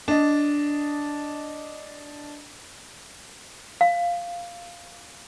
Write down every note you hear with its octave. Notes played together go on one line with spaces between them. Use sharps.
D4 D#5
F5